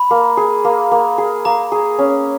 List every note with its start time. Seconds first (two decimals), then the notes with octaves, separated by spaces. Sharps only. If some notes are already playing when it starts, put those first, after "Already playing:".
Already playing: B5
0.11 A#3
0.37 G#4
0.65 A#3
0.91 A#3
1.18 G#4
1.45 A#3 A#5
1.72 G#4
1.99 C#4